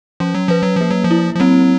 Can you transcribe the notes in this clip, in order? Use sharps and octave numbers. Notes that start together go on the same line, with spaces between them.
F3 C#4
F#3
F3 B4
F#3
F3 A#3
F#3
F3
E4
F3
F#3 C4